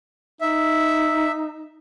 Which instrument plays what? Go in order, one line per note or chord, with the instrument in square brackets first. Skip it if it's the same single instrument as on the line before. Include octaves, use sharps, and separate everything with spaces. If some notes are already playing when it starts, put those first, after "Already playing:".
[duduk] D#4 [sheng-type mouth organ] E5